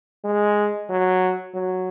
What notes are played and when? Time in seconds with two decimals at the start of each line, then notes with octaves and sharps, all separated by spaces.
0.25 G#3
0.90 F#3
1.54 F#3